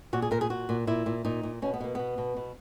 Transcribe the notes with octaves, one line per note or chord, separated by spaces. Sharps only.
A#2 F#4
G#4
A#2 A#4
G#4
A#2 F#4
A#2
A#2 E4
A#2
A#2 D#4
A#2
B2 C#4
B3
B2 A#3
B2 B3
B2
B2